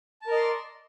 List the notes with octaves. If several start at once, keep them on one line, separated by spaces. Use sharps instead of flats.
A#4 D5 D#5 A5 C6